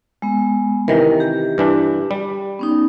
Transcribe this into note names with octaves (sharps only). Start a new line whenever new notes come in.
G#3 B3
C3 D#3 E3 A#4 D#5
G4
G2 E3 D4
G3
B3 C#4 D#4